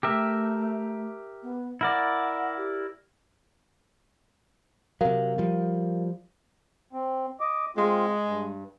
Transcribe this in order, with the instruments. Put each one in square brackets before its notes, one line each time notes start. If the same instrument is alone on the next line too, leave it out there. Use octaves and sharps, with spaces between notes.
[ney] A3 [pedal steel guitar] G4 A#4 E5
[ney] B3
[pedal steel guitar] E4 A#4 D5 [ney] F#5
[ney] G4
[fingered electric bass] C3 F#3 [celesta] A#4 F5
[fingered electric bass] F3 G3
[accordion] C4
D#5 D6
[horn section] G#3 [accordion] C4 F4
[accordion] G2